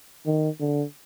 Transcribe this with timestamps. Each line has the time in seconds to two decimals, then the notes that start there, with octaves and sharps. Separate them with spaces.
0.26 D#3
0.60 D3